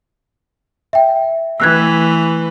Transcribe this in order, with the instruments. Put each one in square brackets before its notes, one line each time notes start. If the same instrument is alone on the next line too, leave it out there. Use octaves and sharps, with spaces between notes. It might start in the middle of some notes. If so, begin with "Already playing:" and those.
[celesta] E5 G5
[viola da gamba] E3 A3 B4 [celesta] E6 F#6 G#6